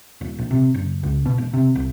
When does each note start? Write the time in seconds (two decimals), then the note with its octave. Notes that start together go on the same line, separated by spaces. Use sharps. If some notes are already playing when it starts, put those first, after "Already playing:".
0.21 D#1
0.38 A#1
0.51 C3
0.74 F#1
1.03 C#2
1.26 B2
1.38 E1
1.53 C3
1.75 C2